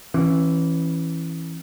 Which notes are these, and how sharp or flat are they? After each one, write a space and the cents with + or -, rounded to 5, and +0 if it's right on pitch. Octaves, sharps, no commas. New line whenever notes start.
E3 +0 C#4 -30